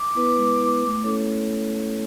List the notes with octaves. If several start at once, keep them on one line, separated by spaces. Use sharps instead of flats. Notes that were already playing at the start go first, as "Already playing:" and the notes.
Already playing: D6
B3 E4 B4
G#3
B3 E4 B4
A3
C#4 E4 A4 C#5